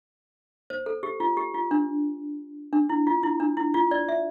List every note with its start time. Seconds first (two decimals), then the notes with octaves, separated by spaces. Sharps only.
0.70 C5
0.86 A4
1.03 G4
1.20 F4
1.37 G4
1.54 F4
1.71 D4
2.73 D4
2.89 E4
3.07 F4
3.23 E4
3.40 D4
3.57 E4
3.74 F4
3.91 D5
4.09 E5